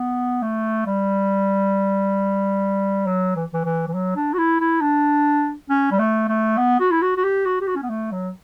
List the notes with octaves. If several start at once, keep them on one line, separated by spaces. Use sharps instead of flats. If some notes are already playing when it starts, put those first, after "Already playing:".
Already playing: B3
A3
G3
F#3
E3
E3
E3
E3
F#3
D4
F#4
E4
E4
D4
C#4
G3
A3
A3
B3
F#4
E4
F#4
F#4
G4
F#4
G4
F#4
C#4
B3
A3
F#3